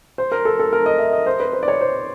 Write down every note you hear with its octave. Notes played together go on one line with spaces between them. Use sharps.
C5
A#4
A4
A4
A#4
D#5
E5
D#5
C5
B4
C5
D5
C#5
C5